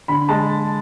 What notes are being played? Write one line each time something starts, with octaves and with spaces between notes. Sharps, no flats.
D3 B5
G#3 A5